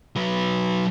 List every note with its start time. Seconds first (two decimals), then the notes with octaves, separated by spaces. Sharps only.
0.17 F#3 B4